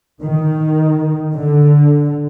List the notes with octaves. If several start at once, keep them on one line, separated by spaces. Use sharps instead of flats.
D#3
D3